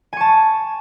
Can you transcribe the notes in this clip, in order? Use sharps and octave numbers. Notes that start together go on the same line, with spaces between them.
G#5 A5 C#6